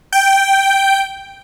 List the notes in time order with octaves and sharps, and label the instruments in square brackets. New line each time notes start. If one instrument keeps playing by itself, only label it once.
[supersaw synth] G5